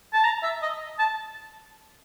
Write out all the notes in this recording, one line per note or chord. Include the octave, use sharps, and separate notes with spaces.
A5
A#5
E5
D#5
A5